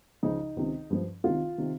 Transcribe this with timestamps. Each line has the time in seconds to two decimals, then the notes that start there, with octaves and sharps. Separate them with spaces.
0.23 C#2 C#3 F3 D#4
0.57 C#2 C3 D#3
0.90 G2 F3
1.24 C2 C3 D#3 F4
1.58 C3 D#3